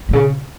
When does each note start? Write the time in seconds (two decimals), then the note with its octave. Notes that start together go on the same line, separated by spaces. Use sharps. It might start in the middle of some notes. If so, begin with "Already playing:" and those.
0.09 A#2
0.13 C#3